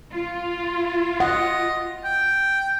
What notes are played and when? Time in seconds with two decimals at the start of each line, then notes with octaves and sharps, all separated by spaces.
0.11 F4
1.20 D#5 F#5
2.05 G5